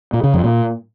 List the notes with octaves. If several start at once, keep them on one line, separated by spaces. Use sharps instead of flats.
A#2
C#3
F2
A#2